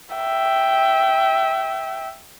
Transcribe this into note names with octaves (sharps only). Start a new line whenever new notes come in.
E5 G5